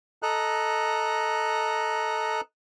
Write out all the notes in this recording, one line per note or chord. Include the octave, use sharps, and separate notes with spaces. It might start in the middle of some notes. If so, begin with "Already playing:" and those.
A4 D#5 A#5 F#6